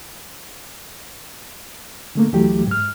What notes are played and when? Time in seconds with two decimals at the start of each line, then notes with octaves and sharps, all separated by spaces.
2.15 D3 A3 A#3
2.33 D2 E3 F#3 A3 G4
2.67 G#2 F6